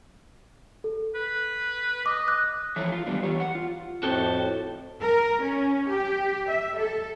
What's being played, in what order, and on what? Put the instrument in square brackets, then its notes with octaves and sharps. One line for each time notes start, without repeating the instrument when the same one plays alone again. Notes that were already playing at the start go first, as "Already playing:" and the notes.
[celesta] A4
[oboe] B4
[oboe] D#5 [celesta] D6
[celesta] F#6
[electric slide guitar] E3 F3 A4 C#5 E5
F4
F#2 D#3 G3 B3 D4
E3 G4 C#5
F#5
F4
[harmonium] F2 A2 A5 [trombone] C4 [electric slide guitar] F#4 A4 G5
[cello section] A#4
C#4
G4
E5
A4